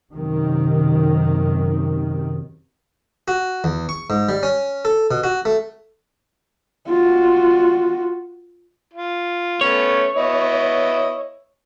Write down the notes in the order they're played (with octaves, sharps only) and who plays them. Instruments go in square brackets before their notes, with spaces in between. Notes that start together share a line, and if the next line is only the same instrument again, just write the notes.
[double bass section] F#2 C3 D#3
[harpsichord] F#4
E2
C#6
G#2
G3
C#4
A4
B2
F#4
A3
[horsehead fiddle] F4 F#4
[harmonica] F4
[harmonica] A3 B3 C#4 [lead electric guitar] C#5
[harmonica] B3 E4 D#5